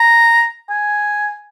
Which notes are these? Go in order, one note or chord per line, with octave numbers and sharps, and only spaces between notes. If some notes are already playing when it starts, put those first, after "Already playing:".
Already playing: A#5
G#5